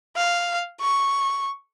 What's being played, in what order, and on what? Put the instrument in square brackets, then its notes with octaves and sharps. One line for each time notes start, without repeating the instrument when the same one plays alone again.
[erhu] F5
C#6